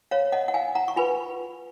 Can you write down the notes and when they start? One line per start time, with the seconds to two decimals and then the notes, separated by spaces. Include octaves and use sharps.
0.11 C#5 F5
0.32 D#5 F#5
0.48 F#5
0.54 F5 G#5
0.75 F#5 A#5
0.88 C#6
0.96 F4 B4 G#5 B5